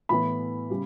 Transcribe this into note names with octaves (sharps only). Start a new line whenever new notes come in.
A2 E3 B3 B5
C#3 G3